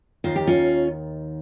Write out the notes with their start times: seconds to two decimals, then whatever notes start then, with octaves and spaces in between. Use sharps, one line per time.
0.24 D#2 D#3 F4
0.36 G4
0.47 C#4 F4